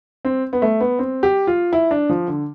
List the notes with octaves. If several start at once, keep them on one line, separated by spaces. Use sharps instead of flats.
C4
B3
A3
B3
C4
G4
F4
E4
D4
F3
D3